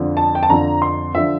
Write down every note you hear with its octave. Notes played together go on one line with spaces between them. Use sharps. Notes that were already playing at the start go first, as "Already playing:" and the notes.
Already playing: F2 D3 F3
A5
G5
A5
F2 D3 F3 A#5
C6
D3 F3 E5